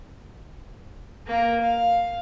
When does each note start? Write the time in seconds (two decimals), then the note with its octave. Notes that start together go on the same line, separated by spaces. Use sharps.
1.26 A#3 A#4
1.60 F5